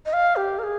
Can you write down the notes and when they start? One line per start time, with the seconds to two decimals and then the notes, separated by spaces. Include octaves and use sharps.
0.06 D#5
0.13 F5
0.36 G4
0.59 A#4
0.63 G#4